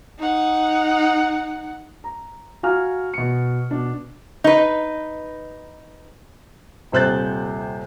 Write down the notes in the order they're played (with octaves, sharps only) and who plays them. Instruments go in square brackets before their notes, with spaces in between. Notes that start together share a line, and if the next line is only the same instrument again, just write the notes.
[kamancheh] D#4 F#5
[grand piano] A#5
F#4 F5 G#5 A#5 F6
B2 C#7
B2 D4
[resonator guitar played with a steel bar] D#4 B4
[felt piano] D#1 C3 C5 F#6 G6 A6